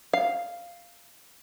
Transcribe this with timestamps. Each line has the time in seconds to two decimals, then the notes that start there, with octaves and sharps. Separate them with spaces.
0.13 F5